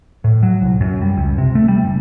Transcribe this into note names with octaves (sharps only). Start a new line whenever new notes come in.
A2
F#3
C2
F#2
G3
C#2
C3
A3
G3
F#1